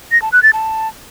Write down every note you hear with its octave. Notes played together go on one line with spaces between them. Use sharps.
A#6
A5
F#6
A6
A5